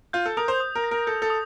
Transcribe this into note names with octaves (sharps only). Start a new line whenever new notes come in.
F4 G6
A4
A#4 D#6
C5
D#6
A#4
A#6
A#4
A4 G6
A4
D#6